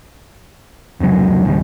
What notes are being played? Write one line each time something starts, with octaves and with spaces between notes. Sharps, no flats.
F1 C#2 B2 F#3
C#2 G#2 D#3 G3